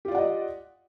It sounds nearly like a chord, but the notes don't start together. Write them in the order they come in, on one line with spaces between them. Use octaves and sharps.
G4 F4 D5 F#5 D#5